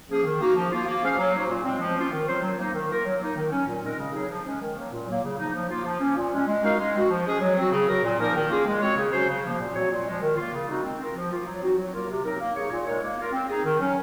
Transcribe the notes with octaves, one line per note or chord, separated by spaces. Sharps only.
F3 A#3 C#4 G#4
D#3
A#3 D#4 F#4
F3
A#3 F4
A#3
C#4 G#4 C5 F5
F#3
A#3 D#4 F#4 C5
A#2
G#3 C4
F3
A#3 C#4 F4
D#3
F#3 C4 F4 C5
F#3
A#3 D#4
D#3
A#3 F4 A#4
F#3
A#3 D#4
D#3
F#3 C#4
A#2
G#3 C4 D#4 A#4
C#3
F#3 C4 D#4 G#4
F3
G#3 C#4
D#3
F#3 A#3
A#2
F#3 A#3
C#3
F3 A#3 D#4
F3
A#3 F4
F3
A#3 C#4
A#2
G#3 C#4
G#3
D#4 F#4 A#4 F5
G#3
C4 F#4
F3
G#3 C#4 G#4
F#3
C4 F#4
C#3
F#3 C4 F#4 A#4
A#2
F3 A#3 D#4 A#4
D#3
A#3 C#4 F4 G#4
G#3
C4 F#4 C#5
C#3
F#3 C#4 F#4 C5
C#3
F3 A#3
A#2
F#3 C4 F#4 C#5
A#2
F3 G#3
D#3
A#3 F4
C#3
G#3 C4 D#4 F#4
C4
F4 A#4
F3
A#3 F4
F#3
C4 D#4 F#4
F#3
A#3 F4 A#4
C3
F#3 C4 D#4 A#4
A#3
D#4 G#4 C#5
A#2
G#3 D#4 A#4 C#5
A#3
F4 A#4
C4
D#4 G#4
D#3
F#3 C#4